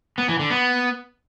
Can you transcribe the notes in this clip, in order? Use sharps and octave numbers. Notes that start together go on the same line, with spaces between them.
B3
E3
D3
B3